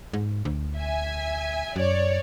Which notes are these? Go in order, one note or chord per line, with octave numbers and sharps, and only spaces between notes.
G#2
D2
E5 G#5
F#2 C#5 D5